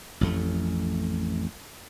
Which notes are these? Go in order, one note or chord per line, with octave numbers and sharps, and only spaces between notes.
A1 F2 A3